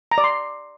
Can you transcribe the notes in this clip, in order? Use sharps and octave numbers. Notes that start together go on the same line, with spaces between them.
A#5
D5
C6